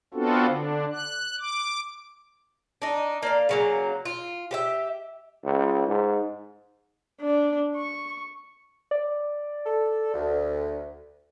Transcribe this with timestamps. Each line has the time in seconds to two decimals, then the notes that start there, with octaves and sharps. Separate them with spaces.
0.14 B3 C4 D4 F4 F#4 A4
0.47 D3 D4
0.93 F#6
1.40 D6
2.82 D4 D#4
3.23 A#3 D5 F5
3.49 C#3 F#3 A#3
4.05 F4
4.51 G4 C5 E5
5.44 C#2
5.88 G#2
7.21 D4
7.76 C#6
8.91 D5
9.65 A4
10.14 D2